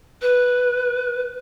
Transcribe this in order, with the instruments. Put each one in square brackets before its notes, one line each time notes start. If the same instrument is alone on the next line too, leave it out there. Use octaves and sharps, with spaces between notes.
[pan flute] B4